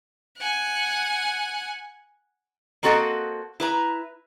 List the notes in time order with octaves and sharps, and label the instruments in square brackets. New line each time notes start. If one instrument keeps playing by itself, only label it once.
[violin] F#5 G#5
[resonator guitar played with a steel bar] A#3 C4 F#4 A4 D#5 F#5
E4 B4 A#5